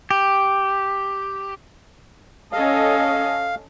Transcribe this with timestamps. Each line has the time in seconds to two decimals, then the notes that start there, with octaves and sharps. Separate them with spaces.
0.11 G4
2.52 C#4 A4 D#5 F5